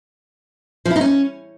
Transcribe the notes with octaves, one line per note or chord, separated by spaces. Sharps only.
F3
E4
D#4
C#4